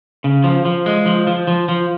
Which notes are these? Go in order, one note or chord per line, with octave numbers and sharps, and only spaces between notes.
C#3
F3
F3
G#3
F3
F3
F3
F3